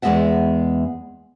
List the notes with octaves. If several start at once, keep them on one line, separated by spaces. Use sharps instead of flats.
E2 G#3 B3 D#5 E5 F#5